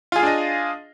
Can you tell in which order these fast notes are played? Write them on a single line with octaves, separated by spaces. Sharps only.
F4 G#4 F5 D4 D#5